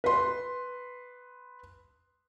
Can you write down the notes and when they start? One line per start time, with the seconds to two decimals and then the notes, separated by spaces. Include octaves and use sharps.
0.04 B4 C6